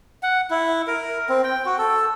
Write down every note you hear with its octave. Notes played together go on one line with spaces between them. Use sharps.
F#5
E4
A#4
C4
G5
F#4
A4